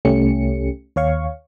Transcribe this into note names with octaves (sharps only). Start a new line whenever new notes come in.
C2 A3 C#4 G4 C#7
D#2 C#5 F5 C#6